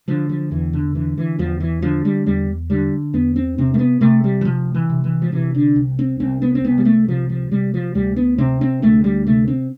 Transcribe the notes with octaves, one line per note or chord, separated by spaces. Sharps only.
D3 F3
F3
E2 E3
D3
D3 E3
E3
E2 F3
E3
D3 F3
G3
E2 G3
D3 G3
E2 B3
C4
C3 C4
A3
B3
C3 A3
G3
E3
C3 F3
E3
C3
E3
F3
C3 E3
D3
C2
C4
C2 C4
B3
C4
C2 B3
G3
A3
C3 F3
F3
C3 G3
F3
D2 G3
B3
C3 C4
C4
D2 A3
G3
C3 A3
C4